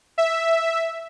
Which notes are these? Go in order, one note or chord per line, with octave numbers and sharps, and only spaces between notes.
E5